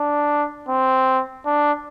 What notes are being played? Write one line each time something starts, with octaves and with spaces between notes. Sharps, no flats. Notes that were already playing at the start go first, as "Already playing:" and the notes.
Already playing: D4
C4
D4